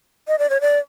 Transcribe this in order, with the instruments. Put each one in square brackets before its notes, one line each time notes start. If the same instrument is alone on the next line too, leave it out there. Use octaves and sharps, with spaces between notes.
[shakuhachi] D#5
D5
C#5
D5